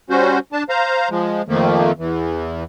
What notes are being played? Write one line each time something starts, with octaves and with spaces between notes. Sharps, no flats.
G3 C#4 F#4 C5
D4 A5
C5 F5 A#5
F3 G#3
F2 D#3 F3 A3 A#3
E2 E3